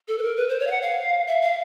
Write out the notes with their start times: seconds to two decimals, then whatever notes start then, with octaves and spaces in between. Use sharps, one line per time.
0.08 A4
0.18 B4
0.23 A#4
0.37 B4
0.49 C5
0.60 C#5
0.67 F5
0.71 F#5
0.82 F5
1.27 E5
1.41 F5